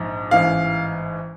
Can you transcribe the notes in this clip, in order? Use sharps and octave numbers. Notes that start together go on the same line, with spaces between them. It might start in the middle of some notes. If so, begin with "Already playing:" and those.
Already playing: A#1 G#2 F3
A1 G#2 E3 F5